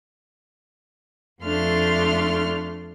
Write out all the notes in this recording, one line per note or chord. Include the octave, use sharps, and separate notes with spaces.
F2 A3 D4 A4 C6 F6